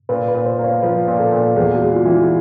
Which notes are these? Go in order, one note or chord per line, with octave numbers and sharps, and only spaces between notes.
A#2 B4
B4
A#2
C5
A#3
C#5
F3 B4
A#2
A4
A#2
E2 G#4
F#4
G#3
F4
E3
E4